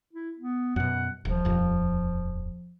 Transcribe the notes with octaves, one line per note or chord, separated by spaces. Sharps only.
E4
B3
F#2 B2 F#5
D#1 F3
D#1 F2